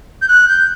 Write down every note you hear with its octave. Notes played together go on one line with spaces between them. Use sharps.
G6
F#6
G6